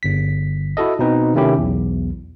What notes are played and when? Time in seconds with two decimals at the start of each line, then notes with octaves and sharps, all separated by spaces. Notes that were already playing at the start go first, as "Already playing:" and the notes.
0.03 G1 B6
0.77 E4 F#4 A4 D#5
0.99 B2 C4 D#4 B4
1.35 C3 D#3 A3 C#4 E4 G4
1.58 B1 E2